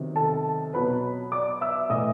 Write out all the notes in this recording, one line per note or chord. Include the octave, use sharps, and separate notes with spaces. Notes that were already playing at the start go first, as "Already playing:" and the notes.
Already playing: C3 D#3 F#3 B3
A4 A5
B2 F#3 B3 B4 B5
D5 D6
E5 E6
A2 E3 A3 D#5 D#6